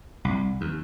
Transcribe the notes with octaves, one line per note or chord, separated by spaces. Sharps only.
C2
D#2